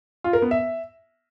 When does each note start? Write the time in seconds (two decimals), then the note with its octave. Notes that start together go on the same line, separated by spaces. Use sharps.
0.24 F4
0.33 A#4
0.42 B3
0.51 E5